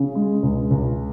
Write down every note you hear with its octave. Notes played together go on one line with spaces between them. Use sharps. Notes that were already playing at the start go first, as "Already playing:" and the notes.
Already playing: C#3
G#3
C#2
C#2